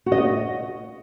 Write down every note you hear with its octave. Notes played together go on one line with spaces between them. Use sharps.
F#4
D#5
F#4